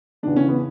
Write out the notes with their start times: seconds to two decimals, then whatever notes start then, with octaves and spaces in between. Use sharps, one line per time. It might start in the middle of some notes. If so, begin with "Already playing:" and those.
0.23 E2 C#3 E3 D4
0.36 C#4
0.49 B3